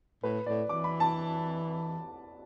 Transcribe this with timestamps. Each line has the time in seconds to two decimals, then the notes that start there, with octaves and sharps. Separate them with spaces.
0.23 A2 B4
0.46 A2 D5
0.69 E3 D6
0.84 B5
1.00 A5